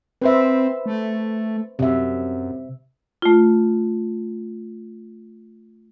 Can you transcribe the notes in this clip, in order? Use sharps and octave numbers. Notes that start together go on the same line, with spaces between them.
C4 B4 C5 E5
A3
F#2 C3 E5
A3 F4